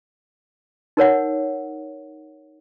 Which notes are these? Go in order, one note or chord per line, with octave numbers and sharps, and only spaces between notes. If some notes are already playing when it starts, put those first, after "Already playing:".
D#4 A#4 C#5 F#5